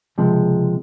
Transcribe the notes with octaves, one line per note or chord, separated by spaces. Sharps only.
C#2 C3 F3 G#3